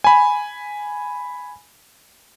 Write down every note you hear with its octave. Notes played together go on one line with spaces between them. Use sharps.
G#5 B5